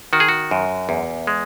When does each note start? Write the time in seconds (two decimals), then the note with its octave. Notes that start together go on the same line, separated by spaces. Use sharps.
0.13 D#3 F#4
0.20 G#4
0.28 F#4
0.51 F#2
0.89 E2
1.27 G#3